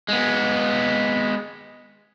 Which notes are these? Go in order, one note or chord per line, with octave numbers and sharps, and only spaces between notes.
G#3 B3